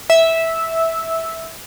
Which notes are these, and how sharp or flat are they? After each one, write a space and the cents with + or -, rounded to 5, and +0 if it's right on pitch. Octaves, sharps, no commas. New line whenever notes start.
E5 -10